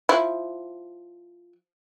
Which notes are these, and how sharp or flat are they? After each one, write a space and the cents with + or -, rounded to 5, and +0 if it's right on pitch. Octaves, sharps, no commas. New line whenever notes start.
F3 +0 E4 +0